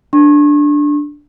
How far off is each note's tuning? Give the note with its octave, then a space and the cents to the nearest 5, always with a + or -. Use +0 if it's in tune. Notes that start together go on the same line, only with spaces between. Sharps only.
D4 +0 C#6 -40